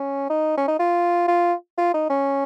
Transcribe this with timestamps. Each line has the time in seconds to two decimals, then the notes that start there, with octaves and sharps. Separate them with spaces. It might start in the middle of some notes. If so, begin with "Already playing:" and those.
Already playing: C#4
0.30 D#4
0.57 C#4
0.68 D#4
0.79 F4
1.28 F4
1.78 F4
1.94 D#4
2.10 C#4